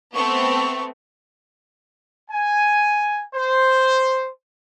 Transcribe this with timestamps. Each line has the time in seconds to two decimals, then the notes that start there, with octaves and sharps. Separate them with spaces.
0.15 A3 B3 C4 C#6
2.30 G#5
3.35 C5